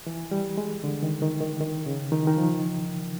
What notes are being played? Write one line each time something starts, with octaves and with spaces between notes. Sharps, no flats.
E3
G3
G#3
D3
D#3
D#3
D#3
D#3
C#3
D#3
E3
D#3
F3